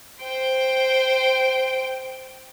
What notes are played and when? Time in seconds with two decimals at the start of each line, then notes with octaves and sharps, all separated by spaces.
0.23 C5 G5